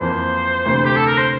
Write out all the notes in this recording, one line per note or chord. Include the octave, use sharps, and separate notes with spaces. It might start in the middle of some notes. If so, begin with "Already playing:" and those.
F2 E3 A#3 C5
D2 C3 E3 A3
G4
A4
A#4
C5